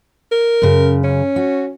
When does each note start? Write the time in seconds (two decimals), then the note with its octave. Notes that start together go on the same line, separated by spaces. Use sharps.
0.32 A#4
0.62 F#2 C#3
1.03 C#4
1.36 F#4